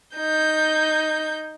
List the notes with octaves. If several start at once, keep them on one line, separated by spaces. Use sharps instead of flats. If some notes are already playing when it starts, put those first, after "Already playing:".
D#4 G6